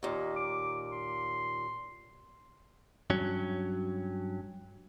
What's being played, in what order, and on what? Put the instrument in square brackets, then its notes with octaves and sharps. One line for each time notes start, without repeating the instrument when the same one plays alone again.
[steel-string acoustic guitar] D#2 A#2 [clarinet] D#5
[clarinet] D6
C6
[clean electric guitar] G2 F#3 C#4